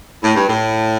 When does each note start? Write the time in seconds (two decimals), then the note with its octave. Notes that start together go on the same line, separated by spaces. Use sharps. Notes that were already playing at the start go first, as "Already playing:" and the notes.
0.23 A2
0.35 G2
0.48 A2